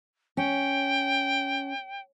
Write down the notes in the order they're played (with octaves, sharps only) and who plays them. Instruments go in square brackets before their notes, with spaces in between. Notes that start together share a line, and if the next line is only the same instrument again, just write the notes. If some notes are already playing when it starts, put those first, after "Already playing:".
[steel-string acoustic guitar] C#4 [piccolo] G5